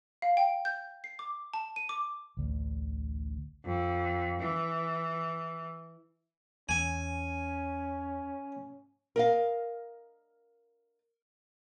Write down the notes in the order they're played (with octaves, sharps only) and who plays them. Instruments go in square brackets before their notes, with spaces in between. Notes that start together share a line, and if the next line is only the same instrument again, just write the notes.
[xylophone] F5
G5
G6
C7
D6
A5
D#7
D6
[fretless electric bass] A1 D2
[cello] F2
E3
[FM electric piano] E2 [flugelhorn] C#4 [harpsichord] G#5
[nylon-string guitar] A#4 D#5 F5